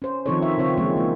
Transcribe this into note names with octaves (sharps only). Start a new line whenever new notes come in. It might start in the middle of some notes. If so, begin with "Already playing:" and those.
C#4 C5
D#3 F3 C4 D#4 A4 C#5
E5
C#3 C4 F4 C#5
E3 F3 G#3 A#3 C4 C#4
A#3